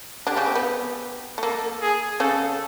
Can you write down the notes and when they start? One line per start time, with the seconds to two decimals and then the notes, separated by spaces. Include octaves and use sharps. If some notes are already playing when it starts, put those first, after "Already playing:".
0.27 D3 D4 G4
0.36 C#3 C#4
0.46 C4
0.55 B3
1.38 A3
1.43 A#3 A4
1.82 G#4
2.20 C#3 C#4 A4